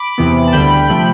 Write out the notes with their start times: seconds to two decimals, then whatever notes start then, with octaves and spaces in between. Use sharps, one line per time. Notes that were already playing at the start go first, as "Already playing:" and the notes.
Already playing: B5 D6
0.18 E2 C3 E3 B3
0.48 A5
0.53 D2 D3 G3 G5 B5
0.90 C3 F3 A3